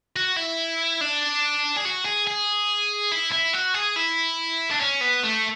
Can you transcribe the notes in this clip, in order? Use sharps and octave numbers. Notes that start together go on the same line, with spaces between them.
F#4
E4
D4
G#4
F#4
G#4
G#4
E4
E4
F#4
G#4
E4
D4
C#4
B3
A3